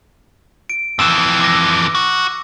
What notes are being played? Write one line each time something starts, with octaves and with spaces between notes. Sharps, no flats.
D7
F2 E3 E6 E7
D6 A#6
F#4